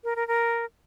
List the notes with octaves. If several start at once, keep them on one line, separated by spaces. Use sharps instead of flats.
A#4
A#4
A#4